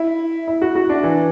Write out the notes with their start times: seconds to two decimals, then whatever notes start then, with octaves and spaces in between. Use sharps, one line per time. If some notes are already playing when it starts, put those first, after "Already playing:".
Already playing: E4
0.47 E4
0.62 F#4
0.75 F#4
0.89 D4
1.04 E3